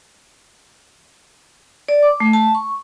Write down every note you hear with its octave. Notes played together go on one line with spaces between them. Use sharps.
D5
D6
A3
A5
C#6